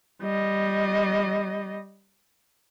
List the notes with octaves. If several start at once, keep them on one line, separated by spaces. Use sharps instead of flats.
G3 D#5